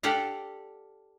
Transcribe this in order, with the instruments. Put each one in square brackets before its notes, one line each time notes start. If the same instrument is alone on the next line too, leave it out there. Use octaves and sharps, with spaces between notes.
[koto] G4 A4 D5 F5 F#5